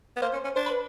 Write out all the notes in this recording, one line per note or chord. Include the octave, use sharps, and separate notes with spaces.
B3
A#3 C5
C#4
C#4
D4 C5
B4